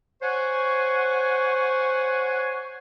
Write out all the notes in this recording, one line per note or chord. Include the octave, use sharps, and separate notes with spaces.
C5 C#5 F#5 G#5 C#6